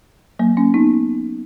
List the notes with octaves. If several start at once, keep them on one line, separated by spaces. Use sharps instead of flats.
F#3 A#3
A#3 C#4
B3 D#4